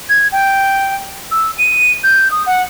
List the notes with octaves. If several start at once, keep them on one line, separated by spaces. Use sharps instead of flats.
G#6
G5
E6
D#7
G6
D#6
F#5